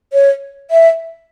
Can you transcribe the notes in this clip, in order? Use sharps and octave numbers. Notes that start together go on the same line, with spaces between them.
C#5
E5